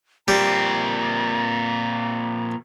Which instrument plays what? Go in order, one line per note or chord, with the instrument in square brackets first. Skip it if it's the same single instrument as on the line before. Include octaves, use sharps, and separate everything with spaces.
[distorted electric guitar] A#2 C4 [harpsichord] G3 [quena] A#5